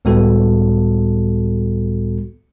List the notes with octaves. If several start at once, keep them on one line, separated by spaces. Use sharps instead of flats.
C#2 A2 G3 B3 F#4 A4